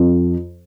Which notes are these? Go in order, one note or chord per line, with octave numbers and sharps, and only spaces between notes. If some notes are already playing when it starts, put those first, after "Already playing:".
Already playing: F2